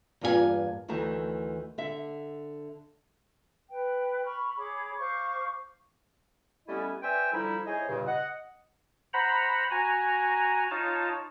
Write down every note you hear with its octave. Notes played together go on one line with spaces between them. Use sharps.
E2 G2 A#3 F4 G4 G#5
D2 D#3 E3 A3 A5
D3 E5
B4 G5
B5 C#6 F6
G#4 C#5 B5 D6
C5 F5 C#6 D6
G3 A3 B3 C#4 E4 D#5
B4 C5 D5 E5 G5 G#5
D3 F3 G3 D#4 E4
E4 G#4 C5 C#5 D#5 G#5
G2 A#2 C#3
D#5 F#5
C5 F#5 A#5 B5
F#4 G#5 A#5
D#4 F4 C#5 A5